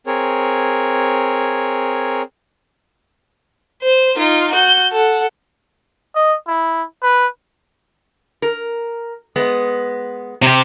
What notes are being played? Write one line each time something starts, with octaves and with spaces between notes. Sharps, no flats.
C4 G#4 A#4 C#5
C5
D#4 F4
F#4 G6
A4 F#5
D#5
E4
B4
A#4
G#3 B3
C3 G4